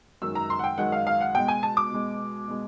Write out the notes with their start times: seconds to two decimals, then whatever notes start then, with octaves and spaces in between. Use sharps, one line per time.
0.22 F#2 D#3 G#3 E6
0.35 A#5
0.50 C6
0.59 F#5
0.64 G5
0.78 F#2 D#3 G#3 F#5
0.92 F5
1.07 F5
1.21 F#5
1.34 B2 G#3 G5
1.48 G#5
1.63 A5
1.77 D6
1.91 B2 G#3
2.48 B2 G#3